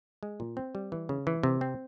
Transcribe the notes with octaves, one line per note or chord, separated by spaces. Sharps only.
G#3
A#2
C4
G3
E3
C#3
E3
C3
C4